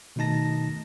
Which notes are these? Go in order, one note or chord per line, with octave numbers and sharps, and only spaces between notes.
B2 D#3 A3 D#4 A5 A#6